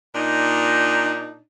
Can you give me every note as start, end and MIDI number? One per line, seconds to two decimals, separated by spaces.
0.15 1.40 46
0.15 1.40 62
0.15 1.40 63